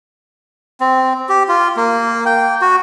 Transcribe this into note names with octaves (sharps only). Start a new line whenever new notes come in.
C4
G4
F4
A#3
G5
F#4